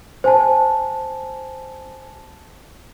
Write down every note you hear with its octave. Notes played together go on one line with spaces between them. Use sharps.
C5 G#5 A5